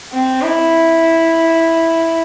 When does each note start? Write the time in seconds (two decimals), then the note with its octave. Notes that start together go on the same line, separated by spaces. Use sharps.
0.12 C4
0.42 E4